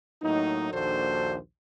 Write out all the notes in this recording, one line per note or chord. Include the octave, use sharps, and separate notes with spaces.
A2 F#3 A#3 D#4
A#1 D#2 D4 F#4 A4 C5